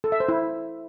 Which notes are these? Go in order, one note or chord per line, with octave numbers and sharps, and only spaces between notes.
A4
E5
C5
E4